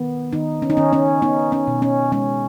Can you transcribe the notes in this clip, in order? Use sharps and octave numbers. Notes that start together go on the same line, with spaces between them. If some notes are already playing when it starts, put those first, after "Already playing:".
Already playing: D#3 B3
D#3 D#4
C#4
D#4
D#3 C#4
C#4
B3 D#4
C#4
B2
C#4
G#3 C#4